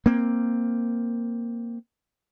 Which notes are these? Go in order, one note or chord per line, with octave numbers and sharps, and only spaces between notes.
A#3 C4